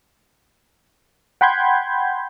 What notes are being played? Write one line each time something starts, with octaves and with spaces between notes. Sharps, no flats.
F#5 G5 B5 C6 G6 G#6